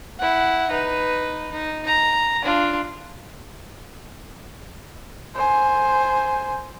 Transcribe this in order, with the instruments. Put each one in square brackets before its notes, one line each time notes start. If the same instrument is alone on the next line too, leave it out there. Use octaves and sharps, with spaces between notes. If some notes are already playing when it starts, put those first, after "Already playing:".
[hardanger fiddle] E4 F#5
D#4 B4
D#4
A#5
D4 F4
[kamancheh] C5 G#5